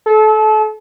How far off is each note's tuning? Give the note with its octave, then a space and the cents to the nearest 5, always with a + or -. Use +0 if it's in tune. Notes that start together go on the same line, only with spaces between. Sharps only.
A4 -30